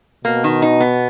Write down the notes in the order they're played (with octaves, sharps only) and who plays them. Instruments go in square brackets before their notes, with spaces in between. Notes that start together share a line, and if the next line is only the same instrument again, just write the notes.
[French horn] B2 [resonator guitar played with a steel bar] A#3
[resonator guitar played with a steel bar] D#3
D#4
B3